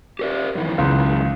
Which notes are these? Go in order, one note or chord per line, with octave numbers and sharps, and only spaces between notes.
G4 A#4 D5
F#2 D#3 E3
C#2